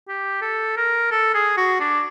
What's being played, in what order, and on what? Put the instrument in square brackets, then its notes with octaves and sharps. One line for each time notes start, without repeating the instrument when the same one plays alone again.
[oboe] G4
A4
A#4
A4
G#4
F#4
D4